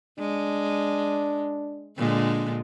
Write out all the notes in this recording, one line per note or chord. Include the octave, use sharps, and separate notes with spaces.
G#3 D4
A#2 D3 G#3